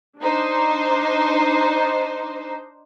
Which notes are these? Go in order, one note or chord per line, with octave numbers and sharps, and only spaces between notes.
D4 D#4 C5